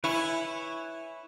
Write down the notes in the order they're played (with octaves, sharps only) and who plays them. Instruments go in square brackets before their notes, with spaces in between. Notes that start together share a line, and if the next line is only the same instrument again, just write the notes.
[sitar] E4 [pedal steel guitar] B4 C#5 G#5